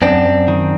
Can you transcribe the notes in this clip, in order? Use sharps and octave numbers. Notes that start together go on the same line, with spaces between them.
F#2 C4 D4
F#2
D#3